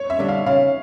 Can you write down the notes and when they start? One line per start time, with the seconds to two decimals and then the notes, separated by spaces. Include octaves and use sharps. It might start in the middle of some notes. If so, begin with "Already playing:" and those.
Already playing: C#5
0.10 E5
0.19 D3 G3 D4
0.29 F5
0.46 C#3 F5